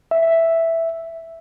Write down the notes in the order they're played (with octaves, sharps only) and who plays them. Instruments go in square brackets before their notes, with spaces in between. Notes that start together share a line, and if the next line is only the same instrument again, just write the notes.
[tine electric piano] E5